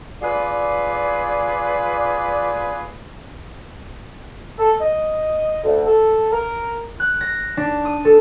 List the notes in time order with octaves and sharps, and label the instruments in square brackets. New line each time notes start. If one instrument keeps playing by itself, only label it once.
[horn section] F4 G#4 B4 D5
[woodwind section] A4
D#5
D2
A4
A#4
[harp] F#6
A#6
D4
D#6
A4